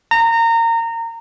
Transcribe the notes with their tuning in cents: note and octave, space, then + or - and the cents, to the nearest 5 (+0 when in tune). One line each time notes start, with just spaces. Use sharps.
A#5 -25